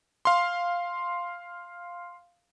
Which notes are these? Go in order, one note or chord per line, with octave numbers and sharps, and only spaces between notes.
F5 C6